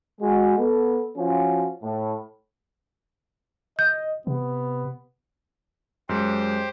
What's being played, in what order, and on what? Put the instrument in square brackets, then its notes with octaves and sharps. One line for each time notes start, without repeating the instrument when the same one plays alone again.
[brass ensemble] G#3 F#4
B3 A4
F3 C#4 F4 F#4
A2
[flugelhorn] D#5 [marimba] G6
[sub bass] C3 [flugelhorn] B3
[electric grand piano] F#2 G#3 [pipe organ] G4 C5